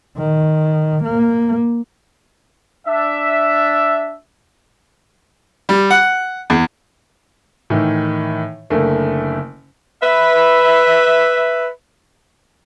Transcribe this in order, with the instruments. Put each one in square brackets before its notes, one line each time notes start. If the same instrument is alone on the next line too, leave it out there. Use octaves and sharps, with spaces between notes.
[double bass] D#3
A#3
[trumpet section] D4 E5
[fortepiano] G3
F#5
E2
[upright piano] A2 D#3 E3
F#1 D3 A3 A#3
[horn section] B4 E5